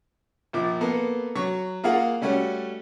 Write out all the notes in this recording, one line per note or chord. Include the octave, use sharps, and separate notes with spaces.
A#1 F3 D6
A#3 B3 A4
F#3 C#6
A#3 F4 G#4 A#4 F5 F#5
G3 A3 C#4 F#4